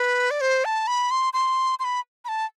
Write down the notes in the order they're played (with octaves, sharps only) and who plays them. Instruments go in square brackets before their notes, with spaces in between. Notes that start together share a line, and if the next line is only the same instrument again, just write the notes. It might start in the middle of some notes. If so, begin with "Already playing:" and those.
Already playing: [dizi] B4
D5
C5
A5
B5
C6
C6
C6
B5
B5
A5